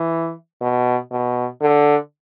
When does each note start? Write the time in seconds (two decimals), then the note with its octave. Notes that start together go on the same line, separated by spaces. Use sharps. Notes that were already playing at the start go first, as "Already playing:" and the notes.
Already playing: E3
0.62 B2
1.12 B2
1.61 D3